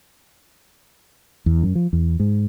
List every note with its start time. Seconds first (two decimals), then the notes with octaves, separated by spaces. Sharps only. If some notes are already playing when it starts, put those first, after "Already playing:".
1.46 E2
1.63 F#2
1.75 F3
1.93 E2
2.20 G#2